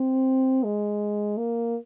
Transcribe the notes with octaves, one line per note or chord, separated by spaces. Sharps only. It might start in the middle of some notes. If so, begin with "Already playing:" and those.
Already playing: C4
G#3
A#3